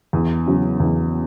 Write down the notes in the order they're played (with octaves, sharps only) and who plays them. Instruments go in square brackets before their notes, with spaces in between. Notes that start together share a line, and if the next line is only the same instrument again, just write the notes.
[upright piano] E2
C#3 F#3
E2